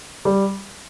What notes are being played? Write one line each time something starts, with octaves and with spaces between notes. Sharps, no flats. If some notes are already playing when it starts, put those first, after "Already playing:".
G3